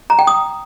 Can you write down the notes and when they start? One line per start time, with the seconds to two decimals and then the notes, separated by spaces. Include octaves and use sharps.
0.10 A#5
0.19 G5
0.27 D#6